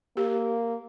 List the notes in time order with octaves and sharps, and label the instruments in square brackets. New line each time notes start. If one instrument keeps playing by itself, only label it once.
[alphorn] A#3 [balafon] G4